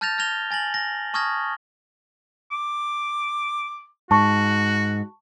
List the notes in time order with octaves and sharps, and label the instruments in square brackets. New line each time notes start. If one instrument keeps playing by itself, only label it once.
[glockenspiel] A5 F6 G6 A6 A#6 F7
F6 G#6 A#6 F7 G7
G#5 A6 A#6 F#7
A#6
A5 C#6 D#6 F6 G#6 A#6
[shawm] D6
[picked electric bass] G#2 [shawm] F#4 [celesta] A5 C#6